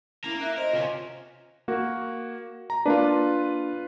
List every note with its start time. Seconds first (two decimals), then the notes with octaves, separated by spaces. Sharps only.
0.24 A#3 C#4 E4 A#4
0.41 E5 F#6
0.57 A#4 C5 D#5
0.73 C3 C#4 F4
1.68 A#3 F#4
2.70 A#5
2.86 A#3 D4 F4 B4